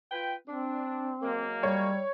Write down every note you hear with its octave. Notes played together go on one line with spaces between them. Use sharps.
F4 B4 G5
C4 D4
F#3 G#3 A#3
G3 C#5